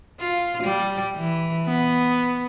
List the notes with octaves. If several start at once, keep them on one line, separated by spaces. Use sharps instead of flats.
F4
G3
E3
B3